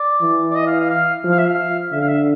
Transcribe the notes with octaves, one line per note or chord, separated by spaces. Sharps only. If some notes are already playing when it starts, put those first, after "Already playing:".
Already playing: D5
E3
D5
D#5
F5
F5
F5
F3
F5
E5
F5
D3 E5
F5
E5